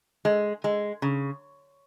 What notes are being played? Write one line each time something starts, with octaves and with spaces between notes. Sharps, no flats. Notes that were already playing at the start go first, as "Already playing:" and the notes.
G#3
G#3
C#3